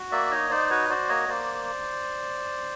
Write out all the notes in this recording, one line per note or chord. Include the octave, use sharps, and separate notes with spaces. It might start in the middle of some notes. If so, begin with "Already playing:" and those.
Already playing: F#4
A#3 D5 E5
D#4 C#5 D#5
D#4 C5 D5
F#4 B4 C#5
F#4 C5 D5
A#3 C#5 D#5
A#3 C5 D5